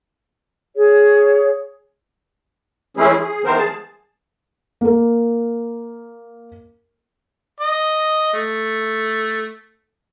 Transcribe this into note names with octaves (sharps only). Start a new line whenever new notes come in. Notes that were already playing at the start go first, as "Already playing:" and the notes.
G#4 C#5
E3 G#3 A3 C#4 E4 G#4
G#4
D#3 E3 B3 A#4 C5
G#4 A5
A#3 A#4
D#5
A3